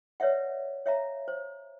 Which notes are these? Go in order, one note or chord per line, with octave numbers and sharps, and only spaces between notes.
B4 C#5 D5 E5 F#5
C#5 E5 F5 A#5
C5